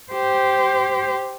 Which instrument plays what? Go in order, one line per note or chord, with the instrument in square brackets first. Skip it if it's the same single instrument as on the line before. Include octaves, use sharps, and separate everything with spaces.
[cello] G4 C5